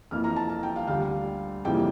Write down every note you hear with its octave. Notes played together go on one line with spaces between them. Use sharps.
F2 E3 A#3 F6
A#5
A5
A5
G5
F5
D2 D3 G3 F5
F2 C#3 E3 G3 A#3 G5